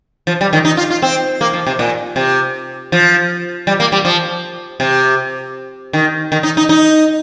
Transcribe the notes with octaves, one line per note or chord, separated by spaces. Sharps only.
F3
G3
D#3
D#4
F4
F4
C4
A#3
F3
C3
A#2
C3
F3
G3
A#3
G3
F3
C3
D#3
D#3
D#4
D#4
D#4